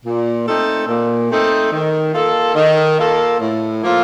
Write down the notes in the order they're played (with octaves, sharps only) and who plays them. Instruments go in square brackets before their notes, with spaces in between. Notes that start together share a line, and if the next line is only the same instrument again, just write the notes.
[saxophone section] A#2
A3 C4 D#4 A4
A#2
A3 C4 D#4 A4
D#3
A#3 F4 A4
D#3
A#3 F4 A4
A2
F3 A#3 F4 A4